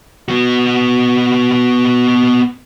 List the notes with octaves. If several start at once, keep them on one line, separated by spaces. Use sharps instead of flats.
B3 F#4